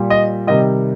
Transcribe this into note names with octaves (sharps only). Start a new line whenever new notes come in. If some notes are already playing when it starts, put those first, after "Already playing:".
Already playing: A#2 G3
D#5
C3 D#3 G3 D#5